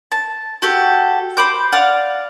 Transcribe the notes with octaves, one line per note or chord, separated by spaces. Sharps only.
A5
F#4 G4 A4
C5 B5 D6 G6
D5 F5 F#5